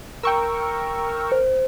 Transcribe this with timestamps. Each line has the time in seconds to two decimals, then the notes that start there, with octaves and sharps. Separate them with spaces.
0.23 A#4 G5 C#6 E6
1.32 C5